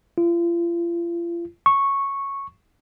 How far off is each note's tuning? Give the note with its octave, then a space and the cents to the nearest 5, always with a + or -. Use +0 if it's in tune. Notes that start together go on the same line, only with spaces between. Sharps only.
F4 -40
C#6 -5